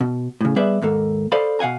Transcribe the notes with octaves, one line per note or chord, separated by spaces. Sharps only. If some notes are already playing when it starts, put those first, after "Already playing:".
B2
A2 C#3
G3 B3 G#4 B4 D5 E5
D#2 G#2 A#3 A4
A4 C5 D5 D#5 F5 B5
B2 F5 F#5 G#5 A#5